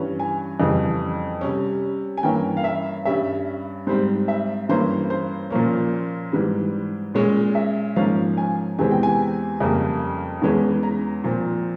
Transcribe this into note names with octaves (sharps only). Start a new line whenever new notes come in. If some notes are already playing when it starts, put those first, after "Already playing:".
Already playing: G2 E3 G3 C#4
G#5
F2 C#3 E3 G3
C3 G3 C#4
G#5
G2 E3 A#3 C#4 G5
F5
E5
G2 G3 C#4 E5
G#2 G3 C4 C5
E5
G2 E3 A#3 C#4 C5
C5
A#2 F3 A#3 C#4
G#2 E3 G3
A#2 G#3 C#4 C#5
E5
G#2 F3 A#3 C#4 F5
G#5
E2 C3 E3 G#3 C4 G#5
G5
G#5
F2 C#3 G3 A#3
E2 E3 G#3 C#4
A#5
A#2 F3 C4